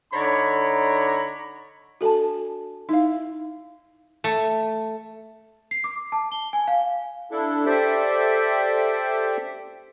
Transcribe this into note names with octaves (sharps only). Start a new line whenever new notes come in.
D3 D#4 C#5 D5 A#5 B5
D4 F#4 A4 G#5 A5
D#4 E4 F5
A3
C7
D6
A5
G7
G#5
F5
D4 E4 A4
G4 A4 C5 D5 E5 G5